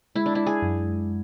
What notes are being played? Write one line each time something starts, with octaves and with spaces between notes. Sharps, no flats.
G#3 E4
D4
E4
G#4
F#2